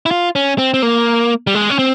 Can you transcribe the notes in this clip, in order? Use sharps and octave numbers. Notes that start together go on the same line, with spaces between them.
E4
F4
C#4
C4
C4
A#3
G3
G#3
C#4
C4